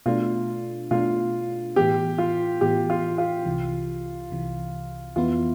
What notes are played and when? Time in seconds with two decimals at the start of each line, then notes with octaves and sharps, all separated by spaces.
0.06 B2 A3 D4 F4
0.91 B2 A3 D4 F4
1.76 A2 E3 B3 G4
2.18 F4
2.61 A2 E3 B3 G4
2.90 F4
3.18 F4
3.46 C2 C3 E3
4.30 C2 C3 E3
5.16 F2 E3 B3 E4 F4